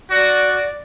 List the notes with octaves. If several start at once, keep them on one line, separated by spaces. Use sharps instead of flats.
F#4 D5